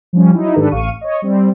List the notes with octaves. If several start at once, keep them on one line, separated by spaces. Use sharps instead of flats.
F3 G3 C#4
F#3 D#4 E4
G#2 D#3 D4 G4 A4 B4
A1 F5 C#6 D#7
C#5 D#5
G3 C4